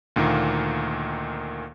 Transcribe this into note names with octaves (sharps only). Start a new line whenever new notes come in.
D2 A#2 D#3 A#3